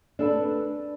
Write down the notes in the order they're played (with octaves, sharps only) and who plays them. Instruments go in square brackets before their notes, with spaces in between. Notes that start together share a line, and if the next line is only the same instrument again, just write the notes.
[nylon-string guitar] D4 A4 B4